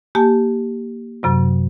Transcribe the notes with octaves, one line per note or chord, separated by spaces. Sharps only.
A#3 G4 G#5 A5
F#2 C3 F#3